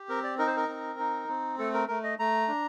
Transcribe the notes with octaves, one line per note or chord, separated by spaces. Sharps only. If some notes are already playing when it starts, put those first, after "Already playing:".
Already playing: G4
C4 A#4
D5
D#4 A#4
C5
A#4
C4
D#4
C4
A3 A4
A#4
A3 A#4
D#5
A3 A#5
D4